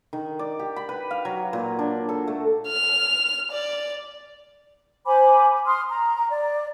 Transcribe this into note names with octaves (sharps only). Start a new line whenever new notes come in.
D#3
D5
G4
B5
B4
F5
F#3
A#2
D4
A4
A3
F6
D5
C5 G#5 B5 D6
C6 D#6 F6
A#5
D5